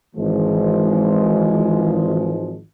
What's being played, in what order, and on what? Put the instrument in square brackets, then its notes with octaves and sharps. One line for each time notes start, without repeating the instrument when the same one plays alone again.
[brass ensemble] G#1 E3 F3 G#3